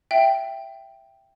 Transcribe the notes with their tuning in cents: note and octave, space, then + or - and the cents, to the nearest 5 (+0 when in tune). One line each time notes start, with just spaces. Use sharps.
E5 +10 G5 +0